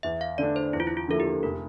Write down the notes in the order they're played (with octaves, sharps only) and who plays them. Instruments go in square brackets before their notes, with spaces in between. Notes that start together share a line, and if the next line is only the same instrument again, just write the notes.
[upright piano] E2 [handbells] E5
[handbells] F5
[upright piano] D3 A3 D4 [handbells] D5
[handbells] C5
[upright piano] E2 [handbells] E4
[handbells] F4
E4
F4
[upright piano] D3 F3 A#3 E4 [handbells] A4
[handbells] G4
[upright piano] F1 [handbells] A#4